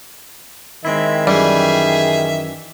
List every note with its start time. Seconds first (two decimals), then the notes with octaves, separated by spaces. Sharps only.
0.85 D#3 G#3 C4 E4 E5
1.27 F#2 E3 G3 G#4 E5